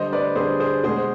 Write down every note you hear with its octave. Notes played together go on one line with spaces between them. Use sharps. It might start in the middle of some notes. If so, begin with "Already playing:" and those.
Already playing: D3 G3 C5 D#5
B4 D5
D3 G3 G#4 C5
G#4 C5
B2 G#3 G#4 C5